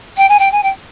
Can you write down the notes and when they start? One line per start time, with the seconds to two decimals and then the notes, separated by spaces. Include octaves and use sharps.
0.17 G5
0.28 G#5
0.39 G5
0.51 G#5
0.62 G5